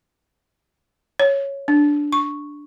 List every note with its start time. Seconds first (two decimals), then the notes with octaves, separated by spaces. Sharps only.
1.19 C#5
1.68 D4
2.13 C#6